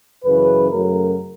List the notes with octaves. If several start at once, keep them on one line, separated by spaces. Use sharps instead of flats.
F#2 C#3 E3 B4
F#2 C#3 F#3 A3 A#4